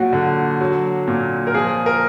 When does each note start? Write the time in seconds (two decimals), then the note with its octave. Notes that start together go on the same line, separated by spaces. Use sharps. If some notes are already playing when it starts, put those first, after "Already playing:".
Already playing: A#2 F#3 F#4
0.13 D3
0.61 F#3
1.08 A#2
1.47 A#4
1.54 F3 G#4
1.86 A#4